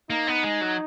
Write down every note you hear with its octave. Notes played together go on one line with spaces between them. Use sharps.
A#3 D#4
B3
G#3
F#3